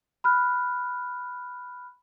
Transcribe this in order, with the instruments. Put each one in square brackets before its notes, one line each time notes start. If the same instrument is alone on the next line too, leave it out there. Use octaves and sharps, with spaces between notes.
[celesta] B5 F6 F#6